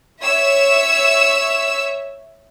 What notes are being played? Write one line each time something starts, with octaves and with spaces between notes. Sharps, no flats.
C#5 E5 E6